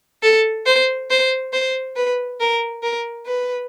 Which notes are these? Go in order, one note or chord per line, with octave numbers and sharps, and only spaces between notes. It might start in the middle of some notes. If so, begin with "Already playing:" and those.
A4
C5
C5
C5
B4
A#4
A#4
B4